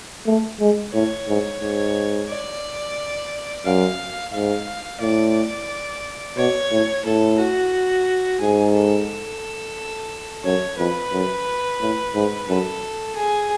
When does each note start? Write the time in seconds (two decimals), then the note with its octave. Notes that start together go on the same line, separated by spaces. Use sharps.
0.26 A3
0.60 G#3
0.93 A2 C#5
1.28 G#2
1.61 G#2
2.29 D5
3.65 F#2 F5
4.33 G#2 F5
5.01 A2 D5
6.37 B2 C#5
6.71 A2
7.05 A2 A4
7.38 F#4
8.41 G#2 G#4
8.75 A4
10.44 F#2 C#5
10.78 F2 B4
11.12 F#2
11.80 A2
12.14 G#2
12.48 F#2 A4
13.16 G#4